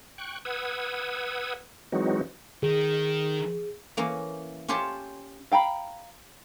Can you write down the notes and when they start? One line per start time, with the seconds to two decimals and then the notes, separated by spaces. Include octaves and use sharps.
0.18 G5 C#6 F#6
0.45 B4 F#5 D#6 E6 G#6
1.92 E3 F#3 G#3 C4 D#4 F#4
2.63 D#3 G#4
3.97 E3 A#3 C#4
4.68 C#4 F4 G4 C5 C#5 A5
5.52 F5 G5 A#5 B5